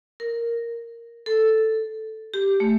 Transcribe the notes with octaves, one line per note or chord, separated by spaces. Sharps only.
A#4
A4
G4
A3